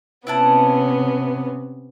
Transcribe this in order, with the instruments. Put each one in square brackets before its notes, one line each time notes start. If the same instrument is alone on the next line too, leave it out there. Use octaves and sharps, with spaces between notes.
[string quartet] C3 B3 C#4 [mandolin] E4 F#5 A5